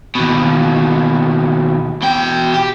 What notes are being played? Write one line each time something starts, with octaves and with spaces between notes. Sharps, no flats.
D#2 B2
B2 G5
G4